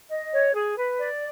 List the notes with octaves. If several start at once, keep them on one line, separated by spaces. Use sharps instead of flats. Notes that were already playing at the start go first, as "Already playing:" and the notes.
D#5
C#5
G#4
B4
D5